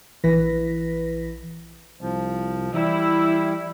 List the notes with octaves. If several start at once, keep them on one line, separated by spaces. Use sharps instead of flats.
A#1 E3 E4 B4 A#6 B6
C2 F3
E3 G3 E4